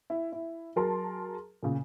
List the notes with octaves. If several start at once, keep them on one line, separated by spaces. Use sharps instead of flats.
E4
E4
F#3 G#4 A#4 A5 C6
A#2 C#3